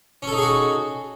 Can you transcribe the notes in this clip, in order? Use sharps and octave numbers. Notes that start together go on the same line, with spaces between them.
C#4 D#4 F#4 G#4 A4